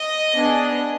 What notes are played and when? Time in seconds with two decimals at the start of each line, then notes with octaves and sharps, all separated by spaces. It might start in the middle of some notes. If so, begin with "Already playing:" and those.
Already playing: D#5
0.34 B3 D4 G#4